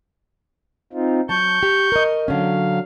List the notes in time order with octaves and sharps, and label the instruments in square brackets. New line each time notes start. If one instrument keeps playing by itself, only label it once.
[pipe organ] C4 D#4 F4
[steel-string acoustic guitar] F#3 A5 [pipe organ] C#6 G6
[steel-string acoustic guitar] G4
A#4 D#5
[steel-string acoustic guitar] D3 C#4 [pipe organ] F#3 F5